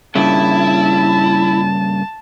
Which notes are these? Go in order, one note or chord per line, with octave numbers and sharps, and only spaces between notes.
G2 A#2 C#3 E4 A5